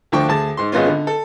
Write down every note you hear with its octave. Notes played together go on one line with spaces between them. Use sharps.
D2 F3 D4 G5 C#6
D2 G#4 A5
G#2 C6
G#1 G#3 B3 C#4 F4
D3
A4